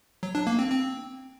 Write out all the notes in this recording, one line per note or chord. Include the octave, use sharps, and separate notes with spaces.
F#3
D4
A#3
C4
C4